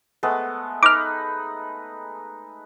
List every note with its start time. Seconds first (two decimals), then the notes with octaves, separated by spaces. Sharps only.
0.23 G#3 A3 B3
0.83 D#4 B4 D6 F6